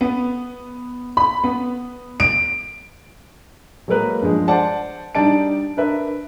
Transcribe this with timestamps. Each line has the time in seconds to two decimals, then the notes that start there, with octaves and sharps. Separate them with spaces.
0.01 B3
1.17 B5
1.44 B3
2.20 D7
3.88 F#3 G#3 A#3 A#4 B4
4.22 G2 F3 G#3
4.48 C5 D5 F#5 A5
5.15 G3 D4 D#4 D5 A5 D7
5.77 D4 A#4 B4 E5